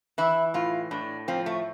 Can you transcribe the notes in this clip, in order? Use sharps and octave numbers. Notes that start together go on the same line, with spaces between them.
E3 E4
A2 F4
A2 D4
F3 C4
A3